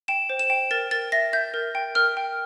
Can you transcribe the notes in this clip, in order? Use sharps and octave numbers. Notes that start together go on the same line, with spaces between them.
G5 E7
C5
E7
G5
A#4 A6
A#4 A6
E5 A#6
E5 G6
A#4
G5
A#4 F6
G5